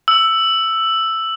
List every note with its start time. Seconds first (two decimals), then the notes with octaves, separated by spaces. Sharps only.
0.08 E6